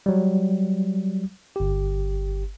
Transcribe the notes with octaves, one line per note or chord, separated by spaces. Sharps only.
F#3 G3
G1 G4